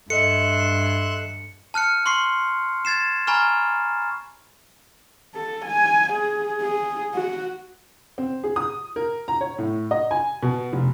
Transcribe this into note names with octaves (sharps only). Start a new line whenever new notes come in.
G2 A4 D#5 E5 C6 F#6 C#7
A5 F6 F#6 C#7
C6 C#6 C7
G#6 A6 C7 E7
G#5 A#5 B5 C#6 F6
A4
G#5
G#4
G#4
F#4
C4
G#4
D#6
A#4
A#5
C#5
A2
D#5
G#5
B2
F1